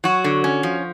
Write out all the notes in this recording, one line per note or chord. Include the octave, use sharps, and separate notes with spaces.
F#3 F#4
D3
C#4
F3